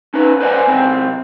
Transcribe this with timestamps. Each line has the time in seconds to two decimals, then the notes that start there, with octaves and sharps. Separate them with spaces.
0.14 C#4 D#4 B4
0.40 B4 C5 D5 D#5 F#5 G#5
0.67 C#2 C4 C5